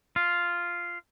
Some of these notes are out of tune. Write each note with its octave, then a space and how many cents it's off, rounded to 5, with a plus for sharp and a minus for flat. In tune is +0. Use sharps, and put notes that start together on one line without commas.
F4 -5